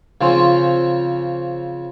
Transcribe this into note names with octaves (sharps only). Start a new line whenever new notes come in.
C#3 F3 C4 C#4 C5